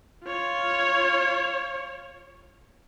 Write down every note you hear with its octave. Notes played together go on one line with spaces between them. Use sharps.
F4 C#5